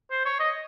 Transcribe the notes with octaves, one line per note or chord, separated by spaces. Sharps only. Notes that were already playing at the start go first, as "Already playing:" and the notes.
C5
C#5
D#5